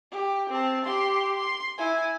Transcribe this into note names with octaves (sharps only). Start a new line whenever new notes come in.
G4
C4 A5
G4 C6
C6
E4 G#5